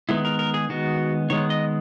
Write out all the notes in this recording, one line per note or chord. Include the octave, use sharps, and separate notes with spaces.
D#3 G#3 B3 E4
A#4
A#4
G#4
D#3 G#3 B3 F#4
D#3 G#3 B3 C#5
D#5